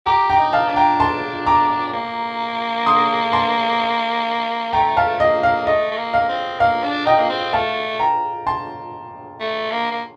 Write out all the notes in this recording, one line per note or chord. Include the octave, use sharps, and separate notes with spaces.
G4 A#5 D6
G5 A#5
D#4
F5 A5
D4
G5 A#5
A5 C6
A#5 D6
A#3
C6 D#6
A5 C6
A3 G5 A#5
F5 A5
A#3 D#5
F5
A3 D#5
A3
A#3
F5
A#3
C4
A#3 F5
D4
D#4 D#5 G5
A#3
C4
A3 F5 A5
G5 A#5
A5 C6
A3
A#3
A#3